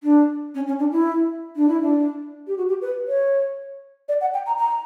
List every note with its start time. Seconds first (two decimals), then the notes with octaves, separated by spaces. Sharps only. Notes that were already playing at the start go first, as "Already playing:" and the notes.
0.03 D4
0.55 C#4
0.67 C#4
0.79 D4
0.92 E4
1.56 D4
1.68 E4
1.81 D4
2.47 G4
2.57 F#4
2.69 G4
2.82 B4
3.08 C#5
4.09 D5
4.21 F#5
4.34 G5
4.46 A#5
4.59 A#5